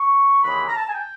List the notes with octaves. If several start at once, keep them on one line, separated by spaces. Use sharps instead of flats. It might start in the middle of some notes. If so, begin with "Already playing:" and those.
Already playing: C#6
D#2 C#3 E3 G#3 C#4 B5
A#5
A5
G#5
G5